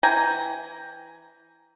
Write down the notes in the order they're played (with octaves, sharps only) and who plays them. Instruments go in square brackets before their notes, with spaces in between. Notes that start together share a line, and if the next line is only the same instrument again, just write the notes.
[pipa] E3 G5 G#5 A#5